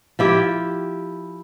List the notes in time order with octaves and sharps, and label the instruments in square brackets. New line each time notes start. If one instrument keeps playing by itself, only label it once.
[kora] F3 E4 G4